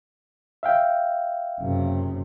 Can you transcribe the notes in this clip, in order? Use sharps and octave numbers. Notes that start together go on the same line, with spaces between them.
E5 F5 G5
F#1 C3